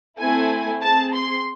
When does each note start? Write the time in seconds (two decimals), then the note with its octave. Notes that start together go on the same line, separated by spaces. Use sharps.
0.18 A3 C4 E4 A4 G#5
0.82 C4 G#4 A5
1.14 C6